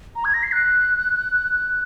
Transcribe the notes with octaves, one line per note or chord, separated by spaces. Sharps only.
A#5
G#6
A#6
C7
F#6